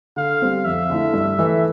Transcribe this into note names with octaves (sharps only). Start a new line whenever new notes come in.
D3 F5
G3 C4
F2 E5
D3 A3 E4
G2
E3 A3